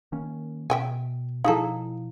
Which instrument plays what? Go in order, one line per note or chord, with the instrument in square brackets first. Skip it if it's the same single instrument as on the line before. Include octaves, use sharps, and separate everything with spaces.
[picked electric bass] D#3 A#3 C#4
[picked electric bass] B2 [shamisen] E5 G5 G#5
[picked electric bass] B2 F3 [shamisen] D#4 G#4 A4 [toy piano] E4 F5